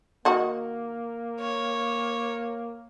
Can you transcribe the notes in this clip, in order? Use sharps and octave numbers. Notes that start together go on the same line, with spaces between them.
D#3 A#3 F#4
C#5